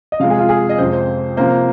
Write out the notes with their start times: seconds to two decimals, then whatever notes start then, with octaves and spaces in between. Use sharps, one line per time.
0.12 D#5
0.20 C3 F3 G#3 F5
0.30 G#4
0.39 F4
0.49 G#4
0.69 D#5
0.78 F2 C3 G#3 C5
0.93 C5
1.37 C3 F3 A#3 C5